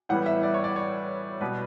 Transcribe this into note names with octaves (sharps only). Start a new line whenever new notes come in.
A2 E3 G3 B3 F#5
E5
D5
C#5
D5
C#5
B2 G3 B3 B4